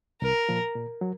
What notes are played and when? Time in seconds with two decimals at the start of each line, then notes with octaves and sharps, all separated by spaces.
0.22 C2 A#4
0.49 A#2 F3
0.75 A#2
1.01 F#3